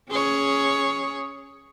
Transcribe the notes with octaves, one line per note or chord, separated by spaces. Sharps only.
C#4 G#4 C#5